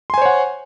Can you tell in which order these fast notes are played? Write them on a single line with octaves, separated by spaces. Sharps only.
C6 G#5 C5 C#5 F#5